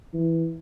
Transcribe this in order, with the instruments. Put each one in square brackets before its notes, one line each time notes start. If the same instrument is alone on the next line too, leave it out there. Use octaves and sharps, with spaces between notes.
[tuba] E3